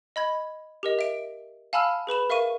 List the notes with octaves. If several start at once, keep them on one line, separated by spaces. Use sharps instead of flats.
D#5 B5 G#6
G4 A#4 D#5
E5 D7
F5 G#5 A5 B5 E6 F6
G#4 B4 B5 E7
A#4 E5 F5 C#6 D#7